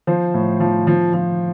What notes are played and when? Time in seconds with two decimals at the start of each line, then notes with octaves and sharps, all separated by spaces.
0.07 F3 C5
0.34 A2
0.60 F3
0.87 F3
1.14 F3